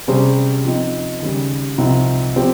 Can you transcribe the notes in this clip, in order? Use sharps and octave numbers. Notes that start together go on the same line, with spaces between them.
C3 G3 C#4 G#4 C5
F3 C4 D#4
D#2 C#3 G3
C2 A#2 F3 C4 D#4
F3 C4 G4 C5